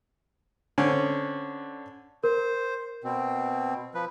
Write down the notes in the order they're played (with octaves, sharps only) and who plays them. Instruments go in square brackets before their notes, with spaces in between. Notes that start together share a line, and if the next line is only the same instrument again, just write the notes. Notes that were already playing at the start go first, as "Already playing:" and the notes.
[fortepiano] D3 C4 C#4
[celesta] A#4 [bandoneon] C5
[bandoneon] B2 C4
F3 B4